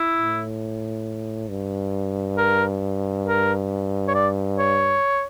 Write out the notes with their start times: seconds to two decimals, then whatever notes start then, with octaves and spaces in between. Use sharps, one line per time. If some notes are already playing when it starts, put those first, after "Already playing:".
Already playing: E4
0.16 A2
1.49 G2
2.38 A#4
3.26 A#4
4.08 C#5
4.15 D5
4.59 C#5